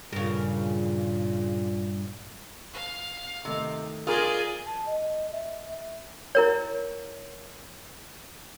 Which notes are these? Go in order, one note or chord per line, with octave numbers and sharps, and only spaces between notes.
G2 A#2 C#3 A#4
F5
C3 D#3 A3 D#4
F4 G#4 A#4 D5 D#5 D#6 F6 G#6
A5
D#5
E5
E4 A#4 C#5